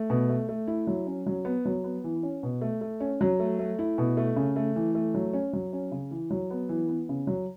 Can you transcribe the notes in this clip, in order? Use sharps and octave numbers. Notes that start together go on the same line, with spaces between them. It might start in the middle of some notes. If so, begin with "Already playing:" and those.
Already playing: A3
B2
A3
A3
E4
F#3
C#4
F#3
B3
F#3
B3
E3
C#4
B2
A3
A3
C#4
F#3
A3
A3
E4
B2
A3
C#3
A3
E3
A3
F#3
C#4
F#3
C#4
C#3
E3
F#3
B3
E3
B3
C#3
F#3